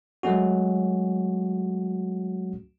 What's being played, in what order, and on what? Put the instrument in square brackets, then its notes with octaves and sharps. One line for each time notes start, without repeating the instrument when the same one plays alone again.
[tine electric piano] F#3 G#3 A3 C#4 F#4